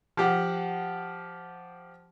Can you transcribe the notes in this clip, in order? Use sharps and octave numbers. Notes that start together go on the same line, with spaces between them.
F3 G4 F#5